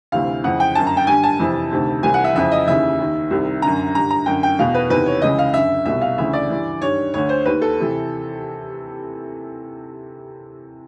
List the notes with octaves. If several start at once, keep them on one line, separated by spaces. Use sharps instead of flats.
D2 C3 E3 F5
F2 C#3 E3 F#5
G5
F#2 D3 A5
A#5
G5
G2 D3 G#5
A5
F2 C3 E3
D2 C3 D#3
C2 C3 E3 G#5
F#5
E5
F2 C#3 E3 E5
D#5
D#2 C#3 E3 E5
D#2 D#3
C2 C3 D#3
F#2 D3 A#5
G2 D3 A#5
A#5
F#2 D3 G5
G5
E2 B2 F5
B4
E2 C3 D#3 B4
C#5
C#2 C#3 E3 D#5
F5
F#2 D3 E5
C2 B2 E5
F5
D2 C#3 E3 E5
D5
G2 E3
G2 D#3 C#5
D2 D3 C#5
C5
D#2 D#3 B4
A4
C3 E3